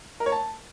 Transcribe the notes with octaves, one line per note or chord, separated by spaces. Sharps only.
A#4
C#5
A5